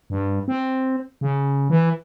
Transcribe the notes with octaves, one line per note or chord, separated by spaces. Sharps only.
G2
C4
C#3
E3